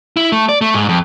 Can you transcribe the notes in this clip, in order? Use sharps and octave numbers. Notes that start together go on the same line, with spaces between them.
E4
A3
D5
A3
G#2
F2